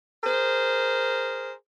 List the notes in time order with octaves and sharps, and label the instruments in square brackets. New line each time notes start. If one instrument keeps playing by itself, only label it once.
[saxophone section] G#4 A#4 C5